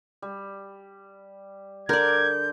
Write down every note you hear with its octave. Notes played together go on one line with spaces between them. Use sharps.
G3
D3 A#4 D5 G6 G#6